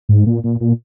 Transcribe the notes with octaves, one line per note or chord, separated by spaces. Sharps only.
G#2
A#2
A#2
A#2